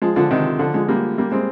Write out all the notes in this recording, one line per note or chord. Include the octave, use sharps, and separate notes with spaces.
F3 G#3
D3 F3
C3 D#3
D3 F3
F3 G#3
G3 A#3
G3 A#3
G#3 C4